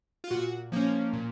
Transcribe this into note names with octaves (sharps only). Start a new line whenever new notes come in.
F4
A#2 F#4
F3 A#3 C#4
A#2